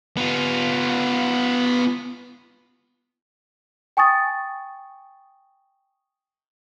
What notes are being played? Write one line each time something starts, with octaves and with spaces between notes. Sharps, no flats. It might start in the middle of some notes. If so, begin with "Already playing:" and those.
B3 F4
G5 G#5 C#6 D#6 A6